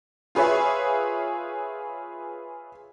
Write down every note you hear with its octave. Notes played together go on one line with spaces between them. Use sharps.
F4 G#4 B4 C#5 E5